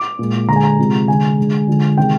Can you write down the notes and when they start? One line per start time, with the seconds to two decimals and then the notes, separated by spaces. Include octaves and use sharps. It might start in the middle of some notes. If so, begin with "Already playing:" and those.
Already playing: D6
0.19 A#2 G#3
0.49 D3 A#5
0.53 G#3 G#5
0.64 A#5
0.78 C3 F3 G#3
1.08 D3 G#3 G#5
1.38 D3 G#3
1.68 D3 F3 G#3
1.97 C3 D#3 G#3 G5